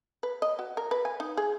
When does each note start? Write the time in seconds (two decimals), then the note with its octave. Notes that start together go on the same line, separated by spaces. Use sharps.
0.23 B4
0.42 D#5
0.59 F#4
0.77 A#4
0.91 B4
1.05 G#5
1.20 D#4
1.37 G#4